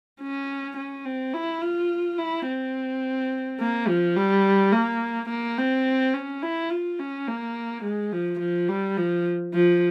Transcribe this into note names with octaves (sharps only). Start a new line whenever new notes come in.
C#4
C#4
C4
E4
F4
E4
C4
A#3
F3
G3
A#3
A#3
C4
C#4
E4
F4
C#4
A#3
G#3
F3
F3
G3
F3
F3